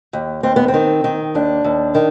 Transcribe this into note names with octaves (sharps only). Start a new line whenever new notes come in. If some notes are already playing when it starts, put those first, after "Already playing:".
D#2
D#2 C4
B3
C4
D#3
D#3
D#2 D4
D#2
D#3